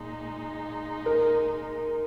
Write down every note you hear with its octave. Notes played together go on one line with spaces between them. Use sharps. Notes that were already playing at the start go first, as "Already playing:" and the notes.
Already playing: A#2 G#3 D#4
A#4